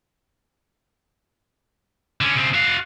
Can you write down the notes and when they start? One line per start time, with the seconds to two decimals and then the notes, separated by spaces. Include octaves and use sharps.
2.21 D3 C#4
2.36 C#3 C4
2.54 F#4 F5